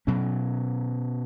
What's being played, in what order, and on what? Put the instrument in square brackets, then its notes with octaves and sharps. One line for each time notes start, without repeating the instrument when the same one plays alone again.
[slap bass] B2 F#3 C#4